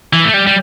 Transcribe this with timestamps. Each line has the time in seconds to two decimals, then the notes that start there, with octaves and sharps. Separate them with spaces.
0.13 E3
0.24 A3
0.34 G3
0.47 G3